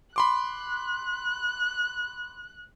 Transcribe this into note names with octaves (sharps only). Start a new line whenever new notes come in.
B5 C6 D6 F#6